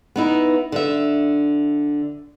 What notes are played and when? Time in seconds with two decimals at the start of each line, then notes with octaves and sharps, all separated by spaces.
0.16 B3 D#4 E4
0.72 D3 E5